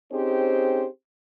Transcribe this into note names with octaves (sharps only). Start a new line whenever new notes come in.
C4 C#4 D#4 G4 G#4 C5